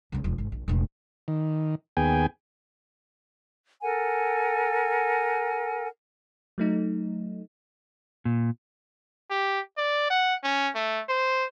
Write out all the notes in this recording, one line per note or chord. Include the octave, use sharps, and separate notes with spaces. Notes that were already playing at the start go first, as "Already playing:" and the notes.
C#2 C#3
E1 F3
G#1
A#1
E1 A2
D#3
D#2 B3 G#4 G5 G#5
A4 A#4 F#5 G#5
F#3 A3 D#4
A#2
G4
D5
F#5
C#4
A3
C5